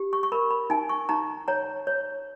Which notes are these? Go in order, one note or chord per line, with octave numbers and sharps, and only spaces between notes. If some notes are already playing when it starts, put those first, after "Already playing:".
Already playing: G4
C#6
C#6
A#4 B5
B5
D#4 G#5
C#6
D#4 A#5
C#5 A#5
C#5